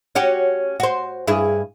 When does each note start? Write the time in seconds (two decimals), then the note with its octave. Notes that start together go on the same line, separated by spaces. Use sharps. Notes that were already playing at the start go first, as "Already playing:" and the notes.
0.15 C#4 F#4 G4
0.80 F#4 C5
1.27 G2 E4 G#4